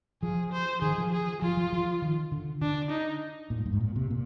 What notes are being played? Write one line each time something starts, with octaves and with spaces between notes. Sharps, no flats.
F3 G#4
C5
D#3 G#4
F3
G#4
F3 F4
F3
F3
D#3
D3
D3 D4
D#4
A#2
G#2
G2
G#2
A#2
C3
A#2